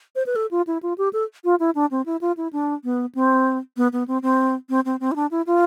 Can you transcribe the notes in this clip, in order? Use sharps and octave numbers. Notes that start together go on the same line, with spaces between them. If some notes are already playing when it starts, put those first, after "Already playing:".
C5
B4
A4
F4
E4
F4
G4
A4
F4
E4
D4
C4
E4
F4
E4
D4
B3
C4
B3
B3
C4
C4
C4
C4
C4
E4
D4
E4
F4